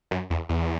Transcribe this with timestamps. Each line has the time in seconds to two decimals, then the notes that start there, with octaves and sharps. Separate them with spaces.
0.11 F#2
0.30 E2
0.49 E2